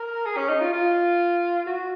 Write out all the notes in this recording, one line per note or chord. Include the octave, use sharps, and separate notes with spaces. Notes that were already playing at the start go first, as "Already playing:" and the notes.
Already playing: A#4
G#4
C#4
D#4
F4
F4
F#4